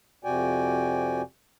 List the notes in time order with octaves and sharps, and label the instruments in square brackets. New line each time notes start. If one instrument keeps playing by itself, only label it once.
[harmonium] F2 C3 F#4 D5 G5 G#5